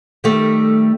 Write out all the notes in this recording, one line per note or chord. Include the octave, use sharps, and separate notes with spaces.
D#3 G3 A3